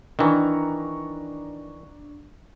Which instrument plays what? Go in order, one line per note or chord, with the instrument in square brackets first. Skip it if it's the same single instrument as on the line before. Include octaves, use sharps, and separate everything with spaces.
[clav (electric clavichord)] D#3 E3 [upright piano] D4 A#5 C#6